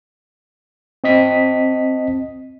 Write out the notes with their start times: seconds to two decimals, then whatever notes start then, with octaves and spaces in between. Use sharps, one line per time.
1.04 C4 D#5 B6